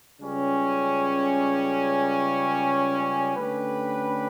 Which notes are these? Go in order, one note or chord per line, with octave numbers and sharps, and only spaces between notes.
C#2 C#3 G3 C#4
D3 A3 C#4 G4 B4